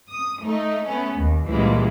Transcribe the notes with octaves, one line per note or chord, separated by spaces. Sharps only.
D#6
A3 D#4
A3 B3 C#4
D#2
C#2 A#2 E3 G3 G#3 A#3